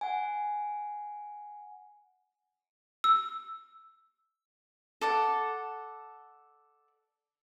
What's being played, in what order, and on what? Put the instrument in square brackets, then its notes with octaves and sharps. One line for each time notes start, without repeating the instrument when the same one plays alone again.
[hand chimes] F#5 G#5
[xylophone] E6
[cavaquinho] A4 D5 F#5